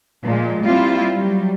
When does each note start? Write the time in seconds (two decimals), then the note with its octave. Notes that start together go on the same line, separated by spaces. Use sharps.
0.25 A#2 F3 G#3
0.66 G3 A#3 C4 E4 F4
1.18 F#3 G3